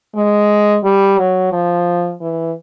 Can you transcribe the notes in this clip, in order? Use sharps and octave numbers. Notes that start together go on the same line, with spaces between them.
G#3
G3
F#3
F3
E3